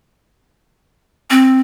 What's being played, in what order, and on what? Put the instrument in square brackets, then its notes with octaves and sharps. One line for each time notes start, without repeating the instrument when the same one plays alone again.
[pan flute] C4